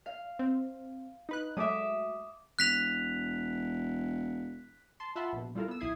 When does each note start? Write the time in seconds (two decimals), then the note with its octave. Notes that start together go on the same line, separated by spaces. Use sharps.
0.06 F5
0.39 C4
1.29 D#4 B4 F#6
1.57 F#3 G#3 A3 E5 D6 D#6
2.59 E1 F#6 B6 F7
5.00 A5 C6
5.16 F4 E5 F#5 A5 B5 C6
5.33 A#1 B2
5.55 G3 E4 F4 A4 A#4
5.68 B3 E6
5.80 B1 E4 D#6 G#6 C7